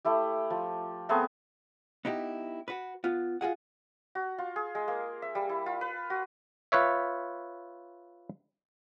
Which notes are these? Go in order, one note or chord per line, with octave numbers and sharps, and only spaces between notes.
A3 E4 G4
F3
A3 B3 C4 G#4
B3 D#4 E4 G4
F#4 B4
B3 F4
F4 F#4 G#4 F#5
F#4
F4
G#4
G#3
A#3
E5
G3
E4
F4
B4
F#4
F4 B4 C#5 E5